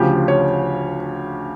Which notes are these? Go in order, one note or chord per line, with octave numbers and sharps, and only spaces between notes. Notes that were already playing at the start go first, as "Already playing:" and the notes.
Already playing: D2 C#3 F3 G4
C#5